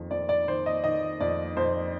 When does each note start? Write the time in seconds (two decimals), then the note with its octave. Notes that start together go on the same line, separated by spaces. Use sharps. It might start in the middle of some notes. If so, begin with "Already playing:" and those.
Already playing: F2 D#3
0.11 F2 D5
0.29 D5
0.47 D#3 C5
0.66 D#5
0.84 D#3 D#5
1.20 F2 D5
1.57 F2 C5